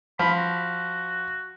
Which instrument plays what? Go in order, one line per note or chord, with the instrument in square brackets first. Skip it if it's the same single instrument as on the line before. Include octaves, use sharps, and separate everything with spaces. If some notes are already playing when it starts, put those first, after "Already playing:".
[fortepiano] F3 [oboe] B5
[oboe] F#4